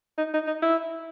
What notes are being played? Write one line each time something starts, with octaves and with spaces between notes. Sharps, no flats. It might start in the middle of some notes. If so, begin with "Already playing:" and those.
D#4
D#4
D#4
E4